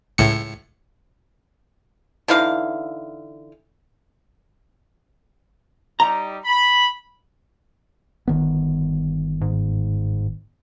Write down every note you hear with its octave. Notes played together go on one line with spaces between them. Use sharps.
C#2 A2 C#7
D3 E3 D#4 F5
G3 D#4 G4 A#5
B5
G1 D#3 B3
G#2